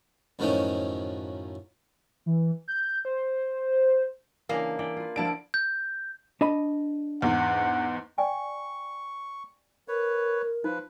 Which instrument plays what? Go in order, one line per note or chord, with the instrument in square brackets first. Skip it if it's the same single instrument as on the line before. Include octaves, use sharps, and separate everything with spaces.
[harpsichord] F#2 A2 D#3 F3 A3 C#4
[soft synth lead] E3
G6
C5
[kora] C#3 E3 D4 [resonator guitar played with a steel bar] A#3
[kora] E3 D5 G5
F4 B4
[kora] D3 E4 [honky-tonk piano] F3 A5 D7
[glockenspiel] G6
[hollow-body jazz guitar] D4 D#5 B5
[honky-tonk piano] E2 G#2 [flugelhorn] F#5
[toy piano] D5 G5 G#5 [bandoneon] C#6
[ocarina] A#4 [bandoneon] B4 C#5
[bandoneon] F3 B4 [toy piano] D#4